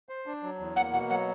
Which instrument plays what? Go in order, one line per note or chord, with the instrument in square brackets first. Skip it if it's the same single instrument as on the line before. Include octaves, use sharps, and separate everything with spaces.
[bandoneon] C5
D4
F#3
E2
[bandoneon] A#3 [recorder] F#5
[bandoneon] B2 [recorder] F#5
[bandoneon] F#3 [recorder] F#5